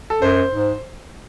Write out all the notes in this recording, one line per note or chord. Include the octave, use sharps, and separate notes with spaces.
A4
F#2 C5
G#2